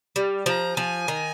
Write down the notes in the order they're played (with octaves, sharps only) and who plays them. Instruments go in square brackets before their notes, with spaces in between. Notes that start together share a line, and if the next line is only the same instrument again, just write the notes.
[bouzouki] G3
[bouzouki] F3 [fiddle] A#5
[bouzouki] F3 [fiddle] G#5
[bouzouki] D#3